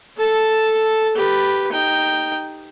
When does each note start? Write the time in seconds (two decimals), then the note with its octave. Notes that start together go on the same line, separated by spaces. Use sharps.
0.17 A4 A5
1.15 G4 B4
1.72 D#4 G5